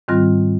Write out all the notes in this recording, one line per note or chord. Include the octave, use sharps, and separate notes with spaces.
G#2 D#3 G3 C4 F4